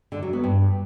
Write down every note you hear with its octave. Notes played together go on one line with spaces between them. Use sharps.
D3
F#3
B3
G2